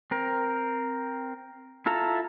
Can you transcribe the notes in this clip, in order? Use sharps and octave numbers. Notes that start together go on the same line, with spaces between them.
C4 A#4
E4 F4 A4 E5 A#5